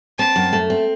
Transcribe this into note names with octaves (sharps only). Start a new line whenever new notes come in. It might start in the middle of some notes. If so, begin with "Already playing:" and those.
C4 A5
F#2
A3
C4